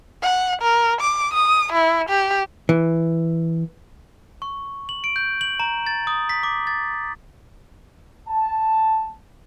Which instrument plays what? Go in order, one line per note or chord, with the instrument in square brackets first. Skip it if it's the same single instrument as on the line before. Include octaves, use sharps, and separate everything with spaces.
[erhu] F#5
A#4
D6
D#6
E4
G4
[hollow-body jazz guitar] E3
[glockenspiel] C#6
F#7
D7
G6
F#7
A#5
A6
D#6
B6
D6
A6
[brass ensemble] A5